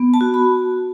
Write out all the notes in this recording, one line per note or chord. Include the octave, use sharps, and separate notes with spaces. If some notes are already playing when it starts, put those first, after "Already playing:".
Already playing: B3
A5
F#4
B5